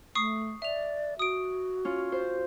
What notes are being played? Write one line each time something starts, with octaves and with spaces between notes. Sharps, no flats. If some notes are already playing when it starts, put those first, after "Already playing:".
A3 C#6 D#6 C7
D5 E5 F7
F#4 D#6 D7
C#4 F4
C5